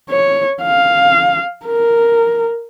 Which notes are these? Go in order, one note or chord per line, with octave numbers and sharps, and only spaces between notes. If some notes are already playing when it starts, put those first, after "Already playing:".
C#5
F5
A#4